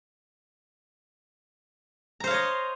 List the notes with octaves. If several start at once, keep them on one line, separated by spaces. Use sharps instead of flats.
C5 C#5 D#5 F5 A#5